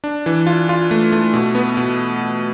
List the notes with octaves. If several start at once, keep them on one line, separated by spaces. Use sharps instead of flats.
D4
E3
F4
F4
A3
A3
B2
B3
B2